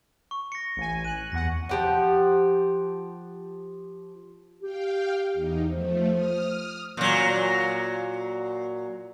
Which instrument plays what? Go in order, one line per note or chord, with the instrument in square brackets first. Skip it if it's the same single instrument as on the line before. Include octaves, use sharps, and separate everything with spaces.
[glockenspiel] C#6
A#6 C#7
[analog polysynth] A1 G#5
[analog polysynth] F#6 [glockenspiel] D#7
[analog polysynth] E2 F#5 [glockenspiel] A#6
[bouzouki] F3 G4 F#5
[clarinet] G4 [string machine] F5 G5
[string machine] E2 D#4
[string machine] F3 A3 [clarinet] C5
[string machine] D#6 F6
[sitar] A#2 F#3